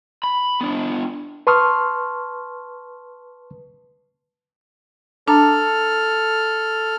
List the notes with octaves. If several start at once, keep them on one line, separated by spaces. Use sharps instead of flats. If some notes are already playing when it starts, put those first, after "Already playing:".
B5
B3 D4
B4 A5 C6 C#6 D#6 F6
D4 A4 A5 A#5 F6